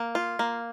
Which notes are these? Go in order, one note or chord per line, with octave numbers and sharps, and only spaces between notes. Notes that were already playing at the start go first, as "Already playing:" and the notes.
Already playing: A#3
F4
A#3